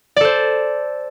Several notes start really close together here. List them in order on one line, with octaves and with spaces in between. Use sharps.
D5 A4 C5